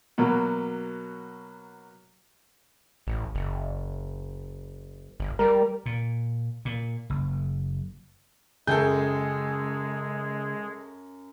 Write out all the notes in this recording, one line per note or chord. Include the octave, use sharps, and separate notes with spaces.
B2 F#3 A#3
A1
F#1
G1
G3 A#4
A#2
A#2
F#1
F#2 C#3 G#3 G#4 A4 G5 G6